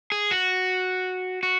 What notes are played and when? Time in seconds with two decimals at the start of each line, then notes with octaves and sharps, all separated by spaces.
0.12 G#4
0.31 F#4
1.43 F#4